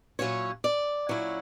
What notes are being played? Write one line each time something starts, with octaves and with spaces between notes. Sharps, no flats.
A#2 F#3 C#4 E4 C#5
D5
A#2 F#3 C#4 E4